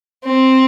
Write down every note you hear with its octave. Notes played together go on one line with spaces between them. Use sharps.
C4